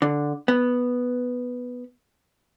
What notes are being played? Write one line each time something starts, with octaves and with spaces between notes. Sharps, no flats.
D3
B3